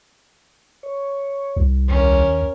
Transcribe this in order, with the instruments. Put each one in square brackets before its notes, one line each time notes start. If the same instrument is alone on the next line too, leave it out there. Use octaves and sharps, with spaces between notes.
[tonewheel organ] C#5
[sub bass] C2
[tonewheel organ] D#2 [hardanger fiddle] C#4 A#4